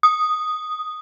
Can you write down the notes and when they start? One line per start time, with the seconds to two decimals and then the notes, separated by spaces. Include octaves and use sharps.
0.03 D#6